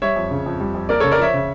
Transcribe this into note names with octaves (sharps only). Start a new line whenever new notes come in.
G3 C#5 E5
F2
C#3
F2
G3
F2
A#3 A#4 D5
C#3 A4 C#5
A#4 D5
F3 C#5 E5
C#3